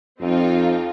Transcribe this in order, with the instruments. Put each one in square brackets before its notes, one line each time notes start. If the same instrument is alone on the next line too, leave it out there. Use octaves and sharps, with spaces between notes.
[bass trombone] F2 [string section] C4 D#4 F4